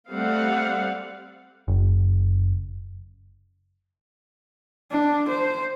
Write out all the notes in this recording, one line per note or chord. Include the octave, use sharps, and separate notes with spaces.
G3 A3 C4 D5 F5 F#5
F#1
D4
C5